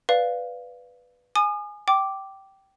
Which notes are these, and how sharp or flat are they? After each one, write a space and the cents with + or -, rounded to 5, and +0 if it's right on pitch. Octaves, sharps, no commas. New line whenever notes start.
B4 +0 D5 -5 F5 +0
G#5 +0 D#6 -40
G5 -15 D6 +0